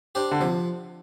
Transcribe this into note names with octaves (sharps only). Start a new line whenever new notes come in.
D4 G4 C5
D3
C3 F3